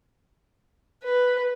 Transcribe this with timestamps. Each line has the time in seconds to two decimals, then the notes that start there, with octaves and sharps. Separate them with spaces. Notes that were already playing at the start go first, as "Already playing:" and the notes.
1.04 B4